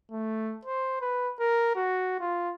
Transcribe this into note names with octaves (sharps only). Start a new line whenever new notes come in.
A3
C5
B4
A#4
F#4
F4